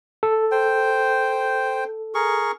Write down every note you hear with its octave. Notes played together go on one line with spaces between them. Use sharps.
A4
C5 G5
G#4 A#4 C#6